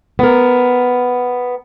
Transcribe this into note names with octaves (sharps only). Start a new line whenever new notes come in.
B3 A#4